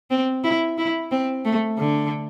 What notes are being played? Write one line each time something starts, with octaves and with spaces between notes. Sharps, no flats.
C4
E4
E4
C4
A3
D3